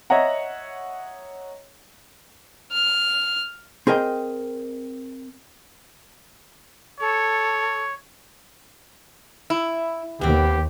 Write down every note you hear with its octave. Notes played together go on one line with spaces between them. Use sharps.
C#5 D#5 E5 F#5 A#5
F6
C4 G#4 A#4 D#5 G5
A4 C#5
E4
D#2 B3 C4 G4